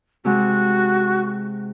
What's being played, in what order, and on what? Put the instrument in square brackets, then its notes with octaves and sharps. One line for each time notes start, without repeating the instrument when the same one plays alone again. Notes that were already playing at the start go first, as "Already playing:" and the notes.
[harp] C3 G#3 [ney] F#4